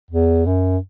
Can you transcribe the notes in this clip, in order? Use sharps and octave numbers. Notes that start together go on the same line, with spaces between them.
E2
F#2